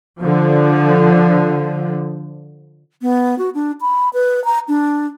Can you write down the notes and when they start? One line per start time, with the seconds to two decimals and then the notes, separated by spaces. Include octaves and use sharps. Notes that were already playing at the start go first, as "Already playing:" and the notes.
0.20 D3 F3
3.02 B3
3.38 F#4
3.54 D4
3.81 B5
4.13 B4
4.45 A#5
4.68 D4